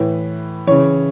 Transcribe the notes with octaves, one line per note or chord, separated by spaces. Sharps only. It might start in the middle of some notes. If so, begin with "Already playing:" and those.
Already playing: A2 E3 B4
C#3 E3 C#5